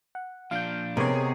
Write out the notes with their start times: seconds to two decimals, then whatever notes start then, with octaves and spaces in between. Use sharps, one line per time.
0.15 F#5
0.51 A#2 F3 D4 F5 G6
0.97 C3 B3 D#4 G#4 A#4 C#5